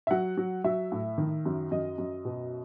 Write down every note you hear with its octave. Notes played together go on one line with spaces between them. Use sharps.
E5
F#3 F#5
F#3
F#3 E5
A2
D#3
F#2
F#2 D#5
F#2
B2